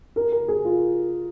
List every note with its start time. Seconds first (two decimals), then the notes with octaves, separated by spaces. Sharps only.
0.16 A#4
0.32 A#4
0.48 G#4
0.65 F4